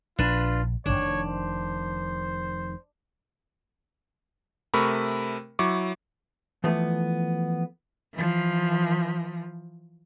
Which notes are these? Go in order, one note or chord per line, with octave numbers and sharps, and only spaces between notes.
A#1 D4 F4 B4
F1 A#1 D#3 D4 C#5
C5
C3 A3 A#4 B5 C#6
F#3 E4 C#6 D6
E3 F3 A3 B3
E3 F3